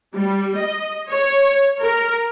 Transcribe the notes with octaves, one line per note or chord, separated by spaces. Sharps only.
G3
D#5
C#5
A#4